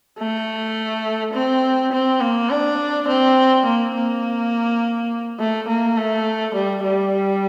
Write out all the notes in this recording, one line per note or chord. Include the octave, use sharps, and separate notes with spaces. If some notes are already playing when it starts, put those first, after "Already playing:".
A3
C4
C4
A#3
D4
C4
A#3
A#3
A3
A#3
A3
G3
G3